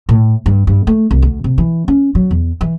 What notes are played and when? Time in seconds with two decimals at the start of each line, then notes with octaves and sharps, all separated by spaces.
0.09 A2
0.46 G2
0.67 G2
0.87 A3
1.11 C2
1.22 D2
1.44 C3
1.58 E3
1.88 C#4
2.15 F#3
2.31 E2
2.61 E3